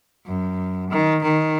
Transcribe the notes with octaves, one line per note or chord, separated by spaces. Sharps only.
F#2
D#3
D#3